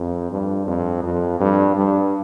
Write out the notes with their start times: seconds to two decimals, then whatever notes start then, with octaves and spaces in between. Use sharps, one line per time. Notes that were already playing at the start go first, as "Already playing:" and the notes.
Already playing: F2
0.31 G2
0.67 F2
1.03 F2
1.40 G2
1.76 G2